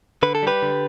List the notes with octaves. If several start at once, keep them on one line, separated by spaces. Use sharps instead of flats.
D3 B4
A4
G3 G4 B4
D3